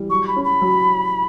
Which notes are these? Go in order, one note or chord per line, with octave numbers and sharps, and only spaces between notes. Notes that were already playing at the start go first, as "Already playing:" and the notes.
Already playing: E3 G3
F#3 C#6
B5
C#4
B5
F#3